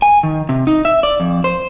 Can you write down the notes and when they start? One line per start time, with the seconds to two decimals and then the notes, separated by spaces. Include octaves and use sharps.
0.02 G#5
0.23 D#3
0.49 C3
0.67 D#4
0.85 E5
1.03 D5
1.20 F2
1.44 C5